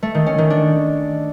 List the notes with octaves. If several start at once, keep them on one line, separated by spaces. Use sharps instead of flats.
A3
D#3
C#4
D#3
D4